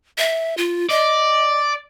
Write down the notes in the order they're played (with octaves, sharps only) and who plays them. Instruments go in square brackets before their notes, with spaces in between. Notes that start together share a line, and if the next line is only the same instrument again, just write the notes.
[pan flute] E5
F4
[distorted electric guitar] D5 [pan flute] D#5